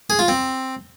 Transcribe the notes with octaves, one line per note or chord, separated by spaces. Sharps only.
G#4
F4
C4